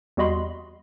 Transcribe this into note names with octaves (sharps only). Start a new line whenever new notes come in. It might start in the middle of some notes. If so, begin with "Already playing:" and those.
E2 G3 F#4 D#5 B5 C6